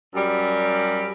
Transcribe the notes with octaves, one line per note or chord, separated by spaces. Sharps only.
F#2 G3